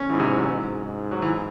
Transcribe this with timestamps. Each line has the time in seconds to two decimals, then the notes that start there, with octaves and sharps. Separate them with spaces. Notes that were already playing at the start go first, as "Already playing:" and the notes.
Already playing: C#4
0.10 G#2 E3
0.20 C3
0.29 E3
0.38 F#3
0.48 G#2
0.85 G#2
1.11 F#3
1.22 E3